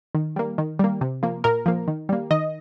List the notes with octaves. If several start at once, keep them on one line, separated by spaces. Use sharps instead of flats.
D#3
G3 A#3
D#3
G3 A#3
C3
F3 A#3
A#2 A#4
F3 A#3
D#3
G3 A#3
D#3 D#5